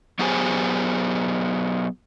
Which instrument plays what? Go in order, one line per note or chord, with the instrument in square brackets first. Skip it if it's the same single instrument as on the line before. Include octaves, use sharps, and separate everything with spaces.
[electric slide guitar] F#3 B3 G4 G#4 C5 G#5